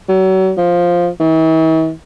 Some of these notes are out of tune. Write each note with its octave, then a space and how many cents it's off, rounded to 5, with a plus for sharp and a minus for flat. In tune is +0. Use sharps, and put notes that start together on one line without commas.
F#3 +35
F3 +5
E3 -45